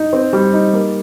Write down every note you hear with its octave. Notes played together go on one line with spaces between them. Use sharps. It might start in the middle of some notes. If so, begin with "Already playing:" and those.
Already playing: D#4
C4
G3
D#4
A#3